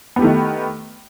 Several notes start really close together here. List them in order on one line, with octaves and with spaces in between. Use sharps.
B3 G4 A3 D#3